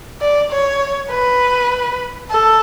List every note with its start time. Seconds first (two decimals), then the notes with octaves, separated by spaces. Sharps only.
0.21 D5
0.50 C#5
1.11 B4
2.31 A4